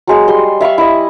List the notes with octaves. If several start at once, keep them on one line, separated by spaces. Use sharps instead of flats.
F#3 G#3 G#4
G3 C6
E5 F5 B5 C#6
E4 D#5